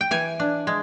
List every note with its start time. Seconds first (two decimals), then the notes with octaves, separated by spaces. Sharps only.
0.01 G5
0.11 E3 G#5
0.40 D4
0.67 G#3